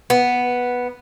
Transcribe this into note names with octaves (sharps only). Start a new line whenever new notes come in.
B3